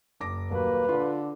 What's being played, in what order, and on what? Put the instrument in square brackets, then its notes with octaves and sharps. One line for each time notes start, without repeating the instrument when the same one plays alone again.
[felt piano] F#1 D6 A#6
[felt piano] D#1 F#3 [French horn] A#3 [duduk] B4
[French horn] D3 [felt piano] F4